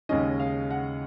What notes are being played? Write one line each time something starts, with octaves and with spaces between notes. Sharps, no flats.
D#2 C#3 G#3 C#4 D#5
F5
F#5